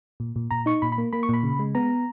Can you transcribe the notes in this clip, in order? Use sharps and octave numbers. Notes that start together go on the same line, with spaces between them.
A#2
A#2
A#2 A#5
D#4 C#6
A#2 B5
B5
A#3
A#3 B5
C#6
A#2 B5
C#3
G#3
B3 A#5